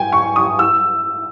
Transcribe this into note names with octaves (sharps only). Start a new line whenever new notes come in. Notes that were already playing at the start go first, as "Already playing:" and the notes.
Already playing: G5 G#5
C#6
D#6
E6